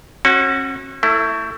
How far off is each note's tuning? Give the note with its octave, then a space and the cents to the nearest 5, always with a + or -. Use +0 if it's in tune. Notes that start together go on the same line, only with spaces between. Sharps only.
C#4 -40 F#4 -5
A3 +25 E4 +0